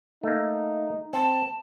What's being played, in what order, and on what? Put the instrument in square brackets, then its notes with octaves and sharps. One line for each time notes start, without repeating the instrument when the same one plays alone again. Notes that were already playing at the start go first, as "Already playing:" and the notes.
[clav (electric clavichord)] A3 A#3 [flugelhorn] D#4
[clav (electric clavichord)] C4 [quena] A5